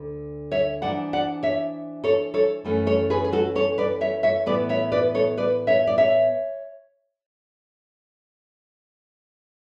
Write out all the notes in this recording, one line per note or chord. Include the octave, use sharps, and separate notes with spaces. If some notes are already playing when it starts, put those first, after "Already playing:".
Already playing: D2 D3
C#5 E5
G#2 E3 G#3 D4 D5 F#5
D5 F#5
C#5 E5
A4 C#5
A4 C#5
F#2 E3 A3 C#4
A4 C#5
G#4 B4
G#4
F#4 A4
A4 C#5
B4 D5
C#5 E5
C#5 E5
A2 E3 B3 E4 B4 D5
C#5 E5
B4 D5
A4 C#5
B4 D5
C#5 E5
D5
C#5 E5